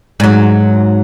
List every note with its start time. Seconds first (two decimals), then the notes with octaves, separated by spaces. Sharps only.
0.20 G#2 F#3